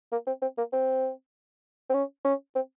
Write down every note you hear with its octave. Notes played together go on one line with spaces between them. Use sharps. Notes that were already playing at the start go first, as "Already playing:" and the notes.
A#3
C4
C4
A#3
C4
C4
C#4
C#4
C4